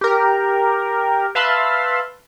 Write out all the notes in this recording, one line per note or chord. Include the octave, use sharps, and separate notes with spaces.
G4 A#4
B4 E5 F5 A5 B5 C6